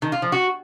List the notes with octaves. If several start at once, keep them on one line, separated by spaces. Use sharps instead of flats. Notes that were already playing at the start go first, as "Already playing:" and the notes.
D#3
F4
F3
F#4